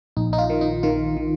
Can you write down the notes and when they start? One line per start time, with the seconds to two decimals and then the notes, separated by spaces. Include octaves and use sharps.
0.17 A#1 D#4
0.33 D#4
0.38 F4
0.50 D#3
0.61 D#4
0.83 D#3 F4
1.17 D#3